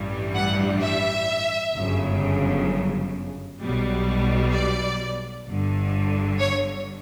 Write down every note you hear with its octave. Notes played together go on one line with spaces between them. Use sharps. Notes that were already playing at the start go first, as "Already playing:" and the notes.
Already playing: A1 G2 E3 G3
F#5
E5
G1 F#2 C#3
B1 B2 G3
D5
G1 G2 D3
C#5